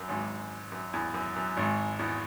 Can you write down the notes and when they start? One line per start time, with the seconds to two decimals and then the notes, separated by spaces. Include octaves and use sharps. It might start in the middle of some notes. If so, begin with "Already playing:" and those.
Already playing: F#2
0.08 G#1 G#2
0.72 F#2
0.93 E2
1.14 F#2
1.36 F#2
1.57 G#1 G#2
1.99 E2